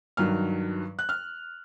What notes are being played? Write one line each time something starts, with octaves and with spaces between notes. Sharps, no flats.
G2 D#3 F#3 F6
F#6
F6